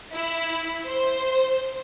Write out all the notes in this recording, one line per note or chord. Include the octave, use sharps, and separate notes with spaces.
E4
C5